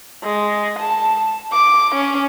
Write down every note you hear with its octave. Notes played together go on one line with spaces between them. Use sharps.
G#3
A5
D6
C#4